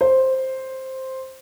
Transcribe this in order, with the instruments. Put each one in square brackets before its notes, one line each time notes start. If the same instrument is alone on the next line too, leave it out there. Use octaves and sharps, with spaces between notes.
[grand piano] C5